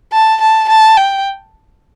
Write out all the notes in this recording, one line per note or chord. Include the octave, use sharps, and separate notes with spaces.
A5
A5
A5
G5